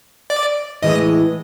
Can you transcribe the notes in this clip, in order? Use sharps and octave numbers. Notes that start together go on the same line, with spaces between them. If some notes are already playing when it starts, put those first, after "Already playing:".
D5
A2 E3 G#3 D#5